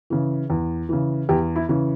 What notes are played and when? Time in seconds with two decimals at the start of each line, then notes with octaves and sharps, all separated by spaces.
0.10 C#3 E3
0.50 E2
0.89 C#3 E3
1.29 E2 G4
1.56 E4
1.69 C#3 E3